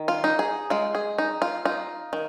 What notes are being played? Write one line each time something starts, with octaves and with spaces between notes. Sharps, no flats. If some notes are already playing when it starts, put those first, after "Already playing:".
Already playing: D#3
F4
D#4
G#4
G#3 F4
G#4
D#4
F4
D#4 F4
D#3